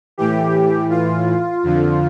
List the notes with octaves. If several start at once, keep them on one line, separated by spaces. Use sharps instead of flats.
A2 E3 G4
F4
F2 D3 F3